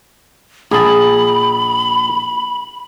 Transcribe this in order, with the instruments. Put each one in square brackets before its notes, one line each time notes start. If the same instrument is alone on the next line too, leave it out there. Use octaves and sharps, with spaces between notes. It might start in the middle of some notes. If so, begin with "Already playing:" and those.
[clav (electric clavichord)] A#1 A5 [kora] G#4 [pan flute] B5